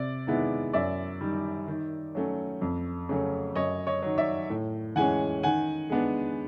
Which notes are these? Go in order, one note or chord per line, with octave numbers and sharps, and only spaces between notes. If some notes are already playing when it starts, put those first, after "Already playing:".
Already playing: C3 D5
D#3 G#3 B3 E4
F#2 D5 E5
D#3 G3
D#3
F#3 A3 C#4
F2
C#3 F#3 A3 C#4
F#2 C#5 D#5
C#5 D#5
D#3 F#3
D5 E5
A2
E3 G#3 C#4 F#5 G#5
D#3 F#5 G#5
G#3 B3 D4